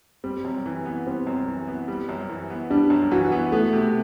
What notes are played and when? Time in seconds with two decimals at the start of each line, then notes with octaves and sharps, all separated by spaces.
0.24 G3 C4
0.45 F#2
0.66 E3
0.85 B3
1.07 G3 C4
1.27 F#2
1.47 E3
1.68 B3
1.88 G3
2.09 F#2
2.29 E3
2.50 B3
2.70 G3 D4
2.90 F#2
3.11 E3 F#4
3.32 B3
3.52 A3 B3
3.73 C3